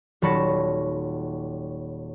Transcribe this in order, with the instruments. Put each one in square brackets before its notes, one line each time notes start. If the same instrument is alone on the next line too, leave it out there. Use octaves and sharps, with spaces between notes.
[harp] D#1 F#3 A5 B5 A#6 C#7